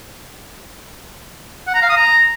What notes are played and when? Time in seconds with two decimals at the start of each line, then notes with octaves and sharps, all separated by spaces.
1.67 F#5
1.74 A#5
1.82 F5
1.89 D#6
1.97 A#5